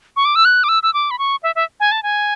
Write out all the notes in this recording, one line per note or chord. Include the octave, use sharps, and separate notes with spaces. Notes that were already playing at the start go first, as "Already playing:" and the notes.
C#6
D6
E6
F#6
D6
E6
E6
D6
B5
C#6
E5
E5
G#5
A5
G#5